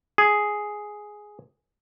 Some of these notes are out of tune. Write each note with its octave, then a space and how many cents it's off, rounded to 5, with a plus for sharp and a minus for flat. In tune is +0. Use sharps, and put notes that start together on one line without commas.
G#4 +5